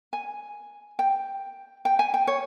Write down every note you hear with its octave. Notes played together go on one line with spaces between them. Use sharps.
G#5
G5
G5
G#5
G5
C#5